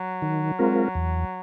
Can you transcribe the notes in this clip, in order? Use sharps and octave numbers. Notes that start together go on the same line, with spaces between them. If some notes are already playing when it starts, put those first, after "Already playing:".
Already playing: F#3
D#3
G#3 C4 F4 A#4
E2